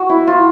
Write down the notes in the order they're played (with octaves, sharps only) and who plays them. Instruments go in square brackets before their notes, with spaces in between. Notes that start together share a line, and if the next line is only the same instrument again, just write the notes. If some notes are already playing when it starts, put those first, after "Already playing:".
Already playing: [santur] F#4
E4
F4